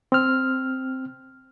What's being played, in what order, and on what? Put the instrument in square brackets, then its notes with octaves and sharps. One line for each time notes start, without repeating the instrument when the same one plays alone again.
[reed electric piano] C4 F6